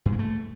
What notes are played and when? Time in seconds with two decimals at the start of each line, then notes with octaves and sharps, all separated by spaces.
0.06 G2
0.12 G#3
0.19 A3